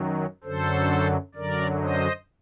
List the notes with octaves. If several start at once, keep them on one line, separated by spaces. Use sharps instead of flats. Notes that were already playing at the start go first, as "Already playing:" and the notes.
Already playing: F#2 D#3 F#3
F#2 D3 F#3 A4 C5
F#2 D3 F#3 A#4 D5
C5 D#5